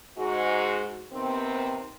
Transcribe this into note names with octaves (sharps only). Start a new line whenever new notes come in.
G#2 G#3 F#4
C3 D#3 B3 C4